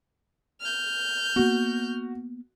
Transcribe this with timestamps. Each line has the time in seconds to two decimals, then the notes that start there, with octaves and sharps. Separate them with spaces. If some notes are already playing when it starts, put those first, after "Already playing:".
0.61 F6 G6
1.36 A#3 B3 F#4